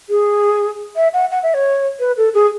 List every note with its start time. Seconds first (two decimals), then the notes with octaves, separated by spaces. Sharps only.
0.09 G#4
0.96 E5
1.13 F#5
1.31 F#5
1.43 E5
1.54 C#5
2.00 B4
2.17 A4
2.34 G#4